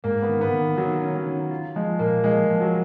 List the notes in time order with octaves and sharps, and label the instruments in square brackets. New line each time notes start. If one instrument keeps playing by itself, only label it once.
[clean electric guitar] G#2 [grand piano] A#3
[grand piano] B3
[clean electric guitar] D#3
[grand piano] B3
[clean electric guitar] D#3
[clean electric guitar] D#3 [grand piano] F#3
[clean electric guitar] C#4
[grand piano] F#3
[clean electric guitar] D#3
F4
[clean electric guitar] F3 [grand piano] G#3
[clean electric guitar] A#2 [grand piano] A#3
[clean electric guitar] F3 [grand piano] G#3
[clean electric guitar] F3
[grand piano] F#3